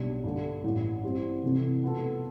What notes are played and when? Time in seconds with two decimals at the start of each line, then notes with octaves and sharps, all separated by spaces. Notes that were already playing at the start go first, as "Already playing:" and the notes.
Already playing: B1 B2 G3 D4
0.24 G2 D3 A3 D4
0.64 A1 G2 E3
1.03 E3 G3 C4
1.43 F1 F2 C3 E3 A3
1.83 B2 B3 F4 A4